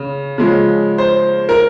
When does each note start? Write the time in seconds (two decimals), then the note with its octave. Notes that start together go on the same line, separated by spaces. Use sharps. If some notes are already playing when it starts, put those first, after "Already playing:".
Already playing: C#3
0.38 C#3 F3 G#3
0.98 C5
1.49 A#4